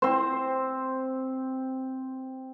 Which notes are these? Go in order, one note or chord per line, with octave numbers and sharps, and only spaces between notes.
C4 C5